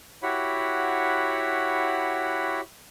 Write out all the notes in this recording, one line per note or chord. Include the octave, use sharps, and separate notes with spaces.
E4 F#4 G4 C#5 F#5 B5